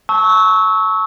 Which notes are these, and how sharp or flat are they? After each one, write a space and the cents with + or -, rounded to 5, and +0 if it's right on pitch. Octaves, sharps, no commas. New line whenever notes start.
A5 +0 C#6 +0 E6 -25